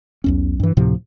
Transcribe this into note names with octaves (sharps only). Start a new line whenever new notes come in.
B1 E2 C#4
G2 E3
D2 A2 C3 F3